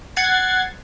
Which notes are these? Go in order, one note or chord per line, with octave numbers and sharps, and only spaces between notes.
F#5 G#6 A6 C7